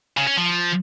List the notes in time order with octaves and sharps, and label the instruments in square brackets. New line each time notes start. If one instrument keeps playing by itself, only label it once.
[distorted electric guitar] C#3
C#4
F3